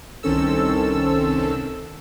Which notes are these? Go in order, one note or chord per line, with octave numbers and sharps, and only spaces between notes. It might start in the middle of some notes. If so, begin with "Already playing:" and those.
C2 D#3 C4 C#4 A4 E6